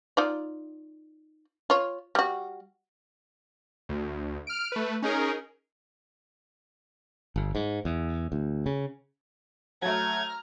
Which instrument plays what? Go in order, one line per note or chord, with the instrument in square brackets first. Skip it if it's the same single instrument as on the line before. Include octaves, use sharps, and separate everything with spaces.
[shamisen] D#4 F4 D5
F4 C#5
G3 F#4
[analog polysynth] D2
F6 D7
A3 B4
C#4 D#4 G#4 A#4
[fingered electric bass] G1
G#2
E2
D2
C#3
[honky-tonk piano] F#3 A3 [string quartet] A#5 F6 [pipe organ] G#6